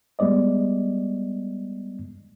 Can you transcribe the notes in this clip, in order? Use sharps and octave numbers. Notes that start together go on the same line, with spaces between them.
G3 G#3 B3 D5 D#5